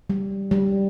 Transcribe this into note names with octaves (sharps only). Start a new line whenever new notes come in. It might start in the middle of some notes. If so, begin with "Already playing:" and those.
G3
G3